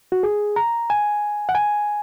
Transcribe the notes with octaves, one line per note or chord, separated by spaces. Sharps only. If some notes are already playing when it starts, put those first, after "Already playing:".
F#4
G#4
A#5
G#5
F#5
G#5